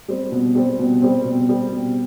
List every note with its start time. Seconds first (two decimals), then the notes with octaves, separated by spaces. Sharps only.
0.08 G3 C4
0.32 B2
0.55 G3 C4
0.79 B2
1.02 G3 C4
1.25 B2
1.49 G3 C4
1.72 B2